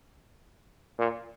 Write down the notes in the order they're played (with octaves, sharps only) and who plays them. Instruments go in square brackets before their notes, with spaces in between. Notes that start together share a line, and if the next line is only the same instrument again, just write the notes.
[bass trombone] A#2